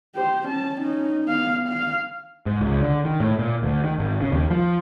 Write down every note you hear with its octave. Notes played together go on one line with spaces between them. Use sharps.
G4 C5
C#4 A5
C#4 D#4
B3 F5
F5
G#2
C#2
D3
D#3
A2
A#2
D2
D#3
G#1
C#3
D#2
F3